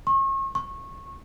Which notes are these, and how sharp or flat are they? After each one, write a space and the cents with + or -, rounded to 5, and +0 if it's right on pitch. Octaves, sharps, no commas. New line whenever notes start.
C#6 -35
C#6 -20